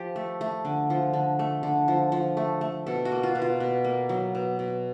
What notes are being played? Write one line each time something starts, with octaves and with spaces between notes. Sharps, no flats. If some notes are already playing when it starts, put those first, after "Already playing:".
Already playing: F3 G4
A3
A3
D3
F3
D3
A3
D3
F3
F3
A3
A3
B2 A4
F#4
A#3
F4
B2
F4
B2
A#3
F#3
B2
B2